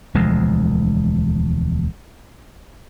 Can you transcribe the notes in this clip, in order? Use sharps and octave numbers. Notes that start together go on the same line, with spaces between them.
E1 D2 F3 G#3